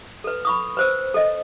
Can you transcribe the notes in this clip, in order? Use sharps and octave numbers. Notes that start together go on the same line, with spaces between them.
A4 B4
B5 C#6 D#6
B4 C5 E6
A4 D#5